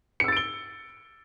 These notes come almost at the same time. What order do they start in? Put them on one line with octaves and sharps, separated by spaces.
C#7 E6 A6 D7 G7